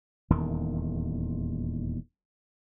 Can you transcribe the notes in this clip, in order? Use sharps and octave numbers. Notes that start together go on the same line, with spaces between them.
D#1 E2 D#3